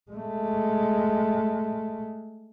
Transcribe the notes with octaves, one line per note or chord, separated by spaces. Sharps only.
G#3 A3